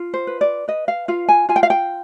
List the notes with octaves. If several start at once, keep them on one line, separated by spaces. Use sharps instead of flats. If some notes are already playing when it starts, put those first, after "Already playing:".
Already playing: F4
C5
B4
D5
B4 D#5
F5
F4 F5
G#5
F4 G#5
G5
F5
G5